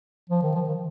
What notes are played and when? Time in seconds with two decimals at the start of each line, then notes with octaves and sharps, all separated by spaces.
0.30 F3
0.42 D#3
0.55 F3
0.68 D#3